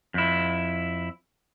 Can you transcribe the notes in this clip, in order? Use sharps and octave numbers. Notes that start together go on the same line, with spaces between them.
F2 E4